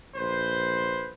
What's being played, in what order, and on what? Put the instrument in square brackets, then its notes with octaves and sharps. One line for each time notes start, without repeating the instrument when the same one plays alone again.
[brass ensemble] A#1 B4 C5